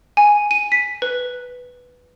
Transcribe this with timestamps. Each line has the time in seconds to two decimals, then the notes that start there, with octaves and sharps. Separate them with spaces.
0.17 G#5
0.51 D#7
0.72 B6
1.02 B4